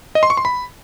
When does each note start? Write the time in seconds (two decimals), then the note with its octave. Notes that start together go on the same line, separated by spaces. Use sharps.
0.15 D#5
0.23 C6
0.30 C#6
0.37 C6
0.45 B5